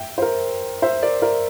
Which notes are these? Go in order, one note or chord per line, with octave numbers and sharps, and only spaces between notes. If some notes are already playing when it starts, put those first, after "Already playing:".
Already playing: E5 G5
C5
A#4
C5 E5
A#4 D5
A#4 D5